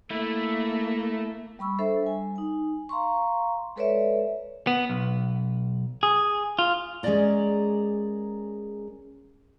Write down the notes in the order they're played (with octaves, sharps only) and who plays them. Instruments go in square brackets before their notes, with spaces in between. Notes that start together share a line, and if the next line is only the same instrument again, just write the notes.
[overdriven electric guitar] A3 [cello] A#3 [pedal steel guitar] E4
[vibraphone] G3 B5 C#6 E6
D4 A4 C5 E5
G3 G#5
D#4 G#5
F5 A#5 C6 C#6
G#3 A4 B4 C#5 D5 E5
[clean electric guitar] B3
B1
G#4
F4
[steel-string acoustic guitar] G#3 C#4 G#4 A#4 D5 A#5